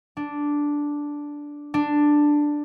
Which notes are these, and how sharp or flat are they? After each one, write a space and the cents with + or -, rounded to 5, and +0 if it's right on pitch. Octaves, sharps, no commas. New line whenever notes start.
D4 -5
D4 +5